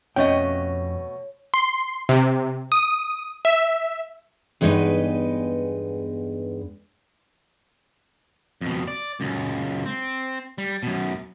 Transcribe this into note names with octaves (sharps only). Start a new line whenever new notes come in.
F2 B2 A3 C#4 C#5 D#5 G5
C6
C3
D#6
E5
E2 G2 G#3 B3 D#4 B4
F2 B2
D5
C#2 F#2
C4
G3
F#2 B2